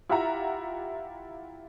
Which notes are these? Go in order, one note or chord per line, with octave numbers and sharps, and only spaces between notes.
E4 F4 G4 E5 F#5 A#5